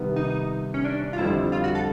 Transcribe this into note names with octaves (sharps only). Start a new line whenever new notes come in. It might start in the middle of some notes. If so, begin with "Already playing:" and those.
Already playing: C3 D#3 G3 B3
D#4
C#4
D4
F4
F2 D3 G3 C4 E4
F4
F#4
A4